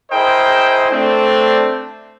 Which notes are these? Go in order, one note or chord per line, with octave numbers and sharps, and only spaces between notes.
E4 G#4 A#4 C5 D#5 G5
A3 C4 D4